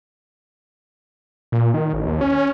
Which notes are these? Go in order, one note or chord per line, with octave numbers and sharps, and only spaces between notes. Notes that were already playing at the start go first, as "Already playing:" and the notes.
A#2
D#3
A1
D#2
C#4